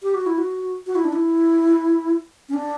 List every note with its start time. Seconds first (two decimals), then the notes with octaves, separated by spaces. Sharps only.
0.03 G4
0.14 F#4
0.26 E4
0.38 F#4
0.87 F#4
0.95 E4
1.05 D4
1.13 E4
2.49 C#4
2.54 D4